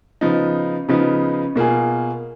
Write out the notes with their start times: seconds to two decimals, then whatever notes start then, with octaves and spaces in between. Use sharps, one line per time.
0.21 C#3 F3 B3 D#4
0.88 C#3 F3 B3 D#4
1.56 B2 A#3 F4 G#4